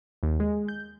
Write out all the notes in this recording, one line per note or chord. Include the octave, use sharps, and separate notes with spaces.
D#2
G#3
G6